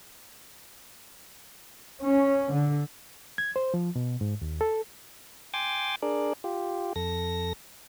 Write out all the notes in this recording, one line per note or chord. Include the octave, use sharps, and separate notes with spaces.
C#4
D3
G#6
C5
F3
B2
G#2
D#2
A4
G5 G#5 C6 D6 A6
D4 G#4 A#4 D5
F4 G4
F2 A4 A#6